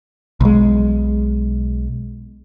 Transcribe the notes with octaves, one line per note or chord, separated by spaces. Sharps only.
B1 G#3